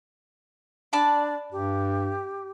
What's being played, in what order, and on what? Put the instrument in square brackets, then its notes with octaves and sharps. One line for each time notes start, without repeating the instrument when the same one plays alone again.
[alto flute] D4 [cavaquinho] D5 A5 B5
[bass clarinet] G2 [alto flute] G4